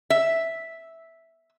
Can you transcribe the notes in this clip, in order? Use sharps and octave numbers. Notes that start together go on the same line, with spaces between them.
E5